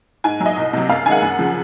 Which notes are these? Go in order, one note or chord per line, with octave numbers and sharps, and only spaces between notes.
G#2 G#5
F#3
D#5
C2
C3 F#3
F#2 F5
D#3 G#3 F#5 G#5
F#2
C#3 F3